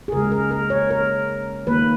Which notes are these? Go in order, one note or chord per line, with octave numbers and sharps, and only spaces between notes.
G#4
C#3 G#3 A#4
A#4
A#4
C#5
A#4
D#3 A#3 B4